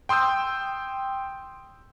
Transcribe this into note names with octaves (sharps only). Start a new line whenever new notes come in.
G5 C6 D#6 E6 G6